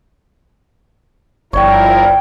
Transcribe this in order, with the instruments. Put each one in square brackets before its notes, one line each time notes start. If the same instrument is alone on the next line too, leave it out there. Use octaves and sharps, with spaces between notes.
[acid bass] G1 [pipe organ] F3 E4 A#4 [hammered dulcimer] C#5 G5 [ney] D5